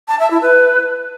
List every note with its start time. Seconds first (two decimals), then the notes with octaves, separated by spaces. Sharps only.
0.08 A5
0.19 E5
0.31 E4
0.42 B4